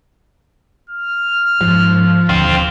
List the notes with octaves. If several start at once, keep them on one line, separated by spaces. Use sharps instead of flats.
F6
G#2 F3
E1 D#2 D3 C4 F4